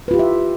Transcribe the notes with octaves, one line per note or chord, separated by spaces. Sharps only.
E4 F4 G4 B4 E5